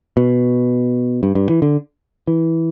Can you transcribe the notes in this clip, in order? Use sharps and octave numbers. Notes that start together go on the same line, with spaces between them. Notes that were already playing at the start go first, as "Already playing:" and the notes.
B2
G2
G2
E3
D3
E3